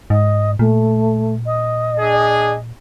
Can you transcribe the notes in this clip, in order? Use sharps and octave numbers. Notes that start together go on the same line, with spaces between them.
G#2 D#5
A#2 A3
D#5
D4 G#4